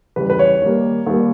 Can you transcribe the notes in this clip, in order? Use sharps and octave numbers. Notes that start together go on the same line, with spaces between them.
E2 C#3 G3 B4
B4
C#5
D#2 D#3 G3 A#3
D#2 D#3 G3 A#3